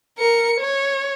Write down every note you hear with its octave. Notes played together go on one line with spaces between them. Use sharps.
A#4 C#7
C#5